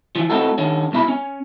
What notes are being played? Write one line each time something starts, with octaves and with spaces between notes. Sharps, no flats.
E3 F3
A3 C4 D#4 E4 F#4 A4
D#3 C#4 D4
C2 B2 E4 B5
C#4